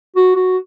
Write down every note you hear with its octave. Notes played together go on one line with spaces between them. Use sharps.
F#4
F#4